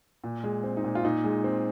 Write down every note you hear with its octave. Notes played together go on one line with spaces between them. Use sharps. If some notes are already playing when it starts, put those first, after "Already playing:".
A#2
G#3
C4
D#4
A#2
F4
A#2 D#4
G#3
C4